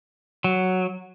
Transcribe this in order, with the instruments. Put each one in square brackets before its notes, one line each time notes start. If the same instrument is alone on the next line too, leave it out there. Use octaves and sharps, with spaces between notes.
[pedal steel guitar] F#3